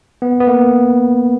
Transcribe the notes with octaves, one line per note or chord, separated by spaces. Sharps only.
B3
B3
A#3